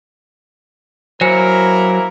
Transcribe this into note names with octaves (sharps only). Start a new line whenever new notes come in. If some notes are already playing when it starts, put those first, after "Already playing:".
F#3 A#3 E4 A#4 C5 G#5 C#7